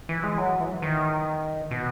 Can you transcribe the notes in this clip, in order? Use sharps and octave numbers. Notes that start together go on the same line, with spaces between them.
E3
G#3
F#3
E3
D#3
B2